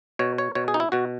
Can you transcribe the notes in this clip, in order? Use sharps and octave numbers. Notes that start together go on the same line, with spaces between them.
B2 C#5
C#5
B2 C#5
G#4
D#4
E4
B2 F#4